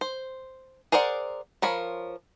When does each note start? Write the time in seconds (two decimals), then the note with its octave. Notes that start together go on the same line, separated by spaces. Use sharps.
0.01 C5
0.92 G#4 A#4 C5 D5 F#5
1.62 F3 A#4 C#5 B5